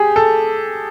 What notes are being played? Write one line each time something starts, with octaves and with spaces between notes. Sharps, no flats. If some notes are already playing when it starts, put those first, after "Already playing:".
Already playing: G4 G#4
A4